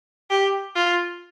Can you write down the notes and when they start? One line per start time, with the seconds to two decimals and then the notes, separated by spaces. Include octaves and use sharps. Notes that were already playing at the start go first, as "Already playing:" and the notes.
0.30 G4
0.76 F4